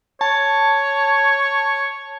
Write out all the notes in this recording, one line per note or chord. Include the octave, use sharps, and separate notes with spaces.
C#5 A5